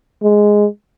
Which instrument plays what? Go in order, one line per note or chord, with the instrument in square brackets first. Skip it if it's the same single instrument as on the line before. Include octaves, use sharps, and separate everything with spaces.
[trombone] G#3